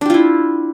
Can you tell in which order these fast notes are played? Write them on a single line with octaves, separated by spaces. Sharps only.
D4 G4 F4 E4